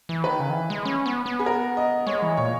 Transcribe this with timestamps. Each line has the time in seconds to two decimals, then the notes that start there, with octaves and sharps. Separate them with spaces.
0.09 E3
0.24 D#3 B4
0.40 C#3
0.50 D#3
0.55 E3
0.70 G#3
0.85 C#4
1.06 B3
1.26 B3
1.39 G#4
1.46 A#4
1.77 D#5
2.07 G#3 C#5
2.22 E3
2.37 A#2 C#5